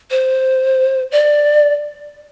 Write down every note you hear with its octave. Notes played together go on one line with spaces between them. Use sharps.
C5
D5